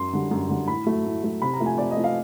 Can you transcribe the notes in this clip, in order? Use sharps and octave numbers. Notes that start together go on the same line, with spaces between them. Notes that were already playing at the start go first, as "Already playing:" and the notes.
Already playing: F#2 C6
D3 G3
F#2
D3 G3
A2 B5
F#3 A3
A2
F#3 A3
C3 B5
A#5
F3 A3
G#5
C3 D5
D#5
F3 A3
F5